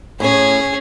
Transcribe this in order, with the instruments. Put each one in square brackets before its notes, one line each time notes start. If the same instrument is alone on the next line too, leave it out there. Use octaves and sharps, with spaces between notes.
[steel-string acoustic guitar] A2 C#5 [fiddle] C#4 G#4